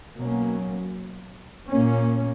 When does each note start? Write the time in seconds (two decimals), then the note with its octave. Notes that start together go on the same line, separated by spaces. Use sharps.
0.17 B2 F#3 A#3 C#4
1.70 A#2 A#3 C#4